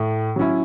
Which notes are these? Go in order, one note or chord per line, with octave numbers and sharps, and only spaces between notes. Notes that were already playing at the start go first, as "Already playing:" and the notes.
Already playing: A2
F#3 C#4 E4